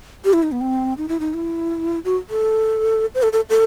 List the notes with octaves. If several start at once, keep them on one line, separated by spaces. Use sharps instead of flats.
G4
E4
D#4
B3
C4
D#4
E4
D#4
E4
F#4
A4
C5
A4
A4
A4